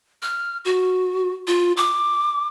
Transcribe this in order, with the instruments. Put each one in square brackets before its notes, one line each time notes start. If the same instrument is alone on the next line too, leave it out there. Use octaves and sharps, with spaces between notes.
[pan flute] F6
F#4
F4
D6